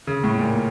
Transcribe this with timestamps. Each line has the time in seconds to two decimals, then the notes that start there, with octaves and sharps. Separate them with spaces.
0.07 C#3
0.24 A2
0.39 A#2